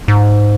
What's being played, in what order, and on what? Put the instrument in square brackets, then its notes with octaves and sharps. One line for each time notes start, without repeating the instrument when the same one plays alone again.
[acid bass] G#2